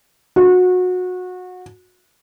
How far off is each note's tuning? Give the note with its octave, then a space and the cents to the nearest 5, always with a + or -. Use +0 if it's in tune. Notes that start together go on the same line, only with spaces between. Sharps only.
F#4 -25